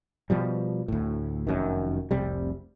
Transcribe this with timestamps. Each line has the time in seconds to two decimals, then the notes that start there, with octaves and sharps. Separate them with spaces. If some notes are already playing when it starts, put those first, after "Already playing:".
0.30 B2 F3 G3
0.88 D2 A2
1.47 F1 F#2 D#3
2.11 F1 C2 C3 G3